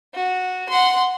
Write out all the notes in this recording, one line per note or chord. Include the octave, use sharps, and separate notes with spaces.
F#4
F#5 C6